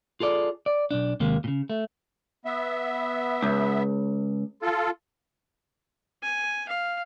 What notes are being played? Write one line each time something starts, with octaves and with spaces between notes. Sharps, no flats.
F4 G#4 A4 D5
D5
B1 E2 D4
D#2 C3 G#3 A#3
A#2 C#3
A3
B3 E5
C#2
F4 A4
G#5
F5